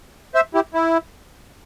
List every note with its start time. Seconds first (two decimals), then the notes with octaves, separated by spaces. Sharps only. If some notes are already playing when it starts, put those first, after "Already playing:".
0.35 C5 E5
0.54 E4 G4
0.74 E4